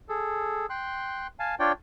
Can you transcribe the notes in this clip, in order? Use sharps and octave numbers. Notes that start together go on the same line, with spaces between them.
G#4 A4
G5 C6 F#6
F5 G#5 A5
D4 F4 C#5 D5 G5